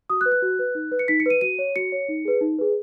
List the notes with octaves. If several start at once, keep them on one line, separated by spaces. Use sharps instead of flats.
F#4 D#6
F#6
B4
F#6
F#4
B4
D#4
B4
C#7
D#4 B6
C#7
B4 D#7
F#4 D#7
C#5
F#4 C#7
C#5
D#4
G#4 B4
D#4
G#4 B4